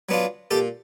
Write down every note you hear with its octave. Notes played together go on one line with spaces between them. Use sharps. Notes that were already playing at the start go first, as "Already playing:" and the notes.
F#3 B3 D4 F4
A#2 G4 A4